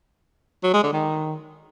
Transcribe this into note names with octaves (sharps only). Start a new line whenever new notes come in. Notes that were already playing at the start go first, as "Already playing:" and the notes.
F#3
G#3
D3
D#3